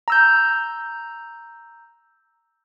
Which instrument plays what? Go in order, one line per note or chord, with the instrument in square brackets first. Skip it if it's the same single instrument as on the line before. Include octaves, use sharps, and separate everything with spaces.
[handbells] A#5 E6 G6